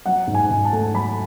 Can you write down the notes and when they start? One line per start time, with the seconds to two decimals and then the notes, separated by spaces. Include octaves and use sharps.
0.06 F#3 F#5
0.27 G#2
0.35 G#5
0.50 G#2
0.65 A5
0.73 A3
0.94 F#3 B5